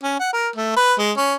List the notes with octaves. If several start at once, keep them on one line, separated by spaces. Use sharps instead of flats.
C#4
F#5
A#4
A3
B4
G#3
C#4